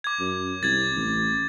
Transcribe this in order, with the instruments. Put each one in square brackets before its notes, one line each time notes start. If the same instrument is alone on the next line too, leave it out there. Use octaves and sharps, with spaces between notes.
[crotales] D6 G#6
[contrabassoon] F#2
[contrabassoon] C2 [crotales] G#6 A6
[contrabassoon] A1